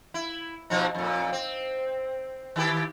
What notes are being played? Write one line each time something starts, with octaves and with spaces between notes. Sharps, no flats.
E4
B2 F3 D#4
F2 A#2
C4
D#3 E4 G4